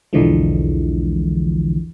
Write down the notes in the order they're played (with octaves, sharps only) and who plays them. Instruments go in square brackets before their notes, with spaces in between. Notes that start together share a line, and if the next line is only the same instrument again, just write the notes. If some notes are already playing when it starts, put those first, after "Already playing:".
[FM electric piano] B1 E2 D3 E3 F3 G#3